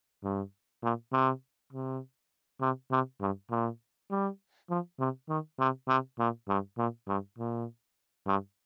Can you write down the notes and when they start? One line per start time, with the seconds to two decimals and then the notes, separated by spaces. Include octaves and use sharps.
0.24 G2
0.83 A#2
1.12 C3
1.73 C3
2.61 C3
2.91 C3
3.21 G2
3.51 A#2
4.11 G3
4.70 F3
5.00 C3
5.29 D#3
5.59 C3
5.88 C3
6.19 A#2
6.49 G2
6.78 A#2
7.08 G2
7.38 A#2
8.27 G2